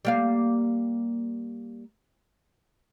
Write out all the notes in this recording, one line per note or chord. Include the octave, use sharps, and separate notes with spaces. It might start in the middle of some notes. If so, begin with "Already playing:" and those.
G3 A#3 F5